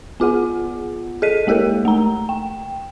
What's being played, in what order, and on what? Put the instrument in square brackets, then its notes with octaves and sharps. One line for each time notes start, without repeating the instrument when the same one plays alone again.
[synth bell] B3 F4 G#4 F#5
G#4 A4 D#5 B6 D#7
G#3 A#3 G4 A4 A#4
A3 A#5
G5